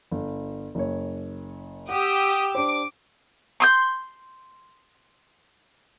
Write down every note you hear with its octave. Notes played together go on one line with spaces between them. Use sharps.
G1
F#1 C#5
G4 F#5 D#6 E6
D4 G4 C5 D6
C6 D#6 G6